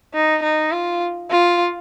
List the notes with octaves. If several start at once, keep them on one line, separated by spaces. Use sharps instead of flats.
D#4
D#4
F4
F4